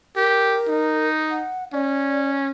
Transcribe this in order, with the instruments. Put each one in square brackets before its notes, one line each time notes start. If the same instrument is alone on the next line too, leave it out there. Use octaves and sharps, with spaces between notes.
[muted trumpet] G4 [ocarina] A#4
[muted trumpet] D#4
[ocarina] F#5
[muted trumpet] C#4 [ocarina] D5